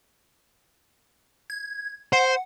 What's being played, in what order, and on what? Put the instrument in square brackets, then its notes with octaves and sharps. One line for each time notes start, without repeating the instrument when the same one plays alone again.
[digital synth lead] G#6
[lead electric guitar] C5 [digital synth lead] F#5